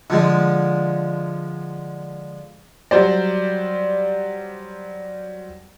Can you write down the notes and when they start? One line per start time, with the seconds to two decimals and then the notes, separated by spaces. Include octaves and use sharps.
0.10 D3 F3 G#3
2.91 F#3 G3 G4 C5 D5